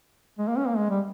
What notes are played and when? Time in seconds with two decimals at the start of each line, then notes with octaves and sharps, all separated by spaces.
0.39 G#3
0.48 A#3
0.58 C#4
0.68 A#3
0.77 G#3
0.90 G3